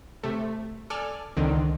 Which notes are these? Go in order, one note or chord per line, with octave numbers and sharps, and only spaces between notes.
C3 A3
A4 D5 G#5 F6
C#2 D3 D#3 C4